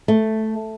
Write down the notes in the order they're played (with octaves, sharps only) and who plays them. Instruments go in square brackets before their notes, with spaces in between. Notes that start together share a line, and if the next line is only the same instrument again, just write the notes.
[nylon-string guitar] A3